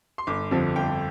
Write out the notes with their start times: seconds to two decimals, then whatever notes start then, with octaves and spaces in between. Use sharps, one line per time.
0.18 C6
0.27 G1 D6
0.51 F2 D3 F3 C4
0.76 G1 G5